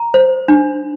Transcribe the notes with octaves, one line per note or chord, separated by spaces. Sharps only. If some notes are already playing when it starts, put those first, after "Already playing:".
Already playing: A#5
C5
D4